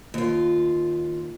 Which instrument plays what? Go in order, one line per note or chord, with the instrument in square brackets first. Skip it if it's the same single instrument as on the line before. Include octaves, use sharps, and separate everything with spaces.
[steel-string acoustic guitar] D#2 F4